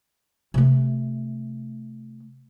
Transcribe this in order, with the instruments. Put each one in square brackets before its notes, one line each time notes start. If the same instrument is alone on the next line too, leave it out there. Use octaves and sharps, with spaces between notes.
[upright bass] C3 A3